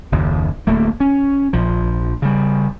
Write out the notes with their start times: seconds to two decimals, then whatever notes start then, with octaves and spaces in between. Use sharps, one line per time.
0.12 F#1 D#2
0.67 D1 A3 A#3
1.00 C#4
1.53 A#1 F3
2.22 C#3 G3